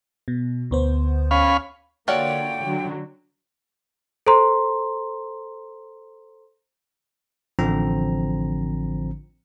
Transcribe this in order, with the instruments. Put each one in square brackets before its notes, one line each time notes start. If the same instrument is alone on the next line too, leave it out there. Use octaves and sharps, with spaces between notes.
[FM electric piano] B2
D2 B3 C5
[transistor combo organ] C#4 F5 B5
[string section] D3 A#3 [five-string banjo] F4 F#4 A4 [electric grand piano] C#5 D5 [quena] G5
[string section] D3 F#3
[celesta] A4 C5 A#5 C6
[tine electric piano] A1 D3 F3 C4 A#5